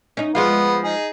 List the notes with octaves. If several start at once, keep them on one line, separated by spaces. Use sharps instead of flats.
C#4 D#4
F3 G#3 B3 F4
D#4 G#4